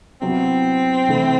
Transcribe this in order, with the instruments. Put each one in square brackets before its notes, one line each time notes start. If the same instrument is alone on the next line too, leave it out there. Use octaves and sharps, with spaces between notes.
[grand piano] C3 F#3 B3 E4 [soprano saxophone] C4
[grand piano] C2 C3 E3 A3 E4